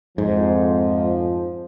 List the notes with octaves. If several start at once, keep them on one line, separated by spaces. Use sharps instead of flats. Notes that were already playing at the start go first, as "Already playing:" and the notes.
F2 G#2 F3